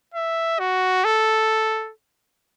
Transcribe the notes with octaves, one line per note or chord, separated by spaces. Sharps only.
E5
F#4
A4